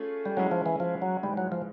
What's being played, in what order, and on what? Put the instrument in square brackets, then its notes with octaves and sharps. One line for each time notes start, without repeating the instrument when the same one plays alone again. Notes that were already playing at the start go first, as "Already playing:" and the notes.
Already playing: [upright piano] A3 C#4 F4 G#4
[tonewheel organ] G3
[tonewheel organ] F#3 [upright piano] G#3 C#4 E4 G#4
[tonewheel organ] F3
E3
F3
F#3
[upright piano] G#2 E3 G#3 [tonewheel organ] G3
[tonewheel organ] F#3
F3